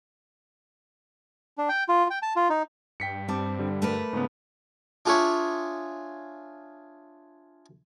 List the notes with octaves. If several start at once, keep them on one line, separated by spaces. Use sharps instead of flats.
D4
G5
F4
G5
A5
F4
D#4
G2 G5 B6 C#7
G3 C4 A5 D6
D3 G3
A3 A#4 B4
G#2 C#3 B3
D4 F4 G#4 C#5 E5 C#6